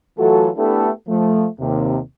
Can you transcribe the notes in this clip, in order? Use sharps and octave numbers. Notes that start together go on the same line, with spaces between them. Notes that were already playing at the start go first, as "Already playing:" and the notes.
E3 F#3 A3 F4 F#4 A4
A3 B3 D4 E4 G4 A4
F3 A3
D#2 C3